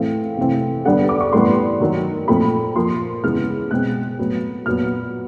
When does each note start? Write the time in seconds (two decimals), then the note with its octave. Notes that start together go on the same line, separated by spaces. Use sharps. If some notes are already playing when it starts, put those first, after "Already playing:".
Already playing: A2 E3 A3 C4 F5
0.38 C3 E3 A3 C4
0.85 D3 G3 B3 F#5
1.09 D6
1.21 C#6
1.33 A2 E3 G3 B3 C6
1.80 D#3 F#3 A#3
2.28 A#2 F3 A3 C4 B5
2.75 A#2 F3 A#3 C6
3.24 C#3 E3 G#3 B3 F6
3.71 B2 G#3 C4 F#6
4.19 A2 F#3 B3
4.66 A#2 F#3 B3 F6